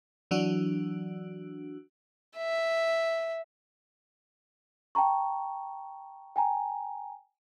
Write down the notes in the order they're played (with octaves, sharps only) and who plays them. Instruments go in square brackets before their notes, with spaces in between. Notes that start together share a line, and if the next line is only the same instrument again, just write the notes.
[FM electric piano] E3 F#3 D4 F#4
[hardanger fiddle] E5
[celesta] G5 A5 A#5 C#6
G5 G#5 A#5